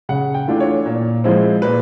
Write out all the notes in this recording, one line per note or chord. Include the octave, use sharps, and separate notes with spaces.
C#3 F#5
G5
E3 A3 D4 F4
C#5
A#2
F3 G#3 C4 E4
A#2 B4